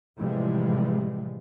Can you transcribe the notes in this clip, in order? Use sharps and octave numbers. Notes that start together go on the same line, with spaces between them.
A2 C3 E3 F3 G3 G#3